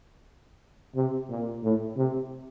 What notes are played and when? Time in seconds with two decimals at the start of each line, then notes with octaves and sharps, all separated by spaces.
0.95 C3
1.30 A#2
1.63 A2
1.97 C3